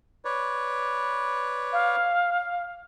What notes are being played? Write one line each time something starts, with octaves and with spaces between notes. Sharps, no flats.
B4 C#5 D5
F5